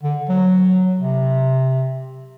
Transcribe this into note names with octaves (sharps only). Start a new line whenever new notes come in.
D3
F#3
C3